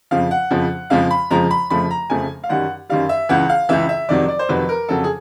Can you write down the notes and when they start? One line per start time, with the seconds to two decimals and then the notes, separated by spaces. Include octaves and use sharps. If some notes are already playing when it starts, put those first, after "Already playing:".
0.11 F2 C#3 F3 F5
0.31 F#5
0.51 F2 C#3 F3
0.90 F2 C#3 F3 G#3 F5
1.11 B5
1.31 F2 C#3 F3 G#3 A#5
1.51 B5
1.70 F2 C#3 F3 A3 B5
1.91 A#5
2.10 F2 C#3 F3 A3 G#5
2.44 F5
2.49 F#2 D#3 G3 F#5
2.89 F#2 D#3 G3 F5
3.09 E5
3.29 C#2 C#3 E3 F#5
3.49 F5
3.69 C#2 C#3 E3 E5
3.89 E5
4.09 F2 C3 D#3 F#3 D5
4.28 D5
4.39 C5
4.49 F2 C3 D#3 F#3 B4
4.69 A#4
4.89 F2 C#3 F#3 A4
5.04 G#4